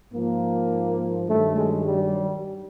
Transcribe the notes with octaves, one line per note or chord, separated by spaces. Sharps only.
G#2 F3 A#3
G2 D#3 F#3 A3
G#3
G3